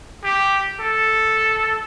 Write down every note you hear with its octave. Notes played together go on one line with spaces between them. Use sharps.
G4
A4